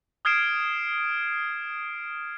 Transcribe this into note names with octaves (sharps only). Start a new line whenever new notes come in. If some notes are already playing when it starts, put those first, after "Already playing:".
D#6 F6 G#6 C7 D7 E7